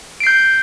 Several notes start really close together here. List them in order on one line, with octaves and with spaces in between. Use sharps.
D7 C7 G6